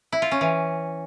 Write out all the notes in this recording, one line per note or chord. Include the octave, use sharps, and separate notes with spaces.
E4
F4
C#4
E3